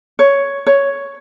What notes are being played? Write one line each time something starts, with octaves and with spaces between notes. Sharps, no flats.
C#5
C#5